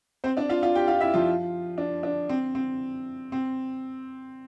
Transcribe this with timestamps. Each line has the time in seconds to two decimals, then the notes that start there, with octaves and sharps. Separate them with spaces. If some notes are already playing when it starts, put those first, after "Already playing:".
0.24 C4 C5
0.37 D4 D5
0.49 F4 F5
0.63 F4 F5
0.75 G4 G5
0.88 F4 F5
1.00 E4 E5
1.14 F3 F4
1.78 D4
2.03 D4
2.29 C4
2.55 C4
3.32 C4